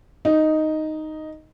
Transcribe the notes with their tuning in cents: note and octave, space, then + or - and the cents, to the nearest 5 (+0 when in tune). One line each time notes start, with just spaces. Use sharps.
D#4 +0